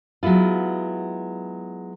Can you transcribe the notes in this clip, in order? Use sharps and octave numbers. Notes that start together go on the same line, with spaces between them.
F#3 G#3 B3 E4 F4